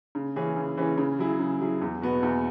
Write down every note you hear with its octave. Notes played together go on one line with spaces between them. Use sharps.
C#3
E3 C#4 G#4
C#3
E3 C#4 G#4
C#3
F#3 E4 G#4
C#3
F#3 E4 G#4
E2
B2 B3 F#4
E2